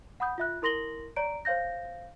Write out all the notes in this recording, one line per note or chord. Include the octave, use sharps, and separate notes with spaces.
F#5 B5 D#6 G6
F4 E5 F#6
E4 A#4 C6 A#6 F#7 G7
C#5 D5 A#5 D7
C5 C#5 F5 G6 A#6